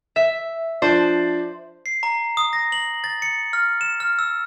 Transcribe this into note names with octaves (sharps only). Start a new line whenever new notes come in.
E5
F3 D4 C5 D5
C7
A#5
D#6
A#6
F#7
A6
C#7
F6
E7
F6
E6